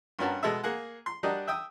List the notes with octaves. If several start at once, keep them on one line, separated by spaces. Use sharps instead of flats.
G2 B3 C#4 F#4 A#4 A5
B2 G#3 A4 E5
A#3 G#4 F#5
C6
G3 D4 F#4 G4 A#4 D#5
E5 G5 D#6 E6